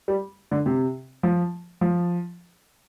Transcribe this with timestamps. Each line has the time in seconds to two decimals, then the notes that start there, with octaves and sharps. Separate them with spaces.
0.08 G3
0.51 D3
0.66 C3
1.23 F3
1.81 F3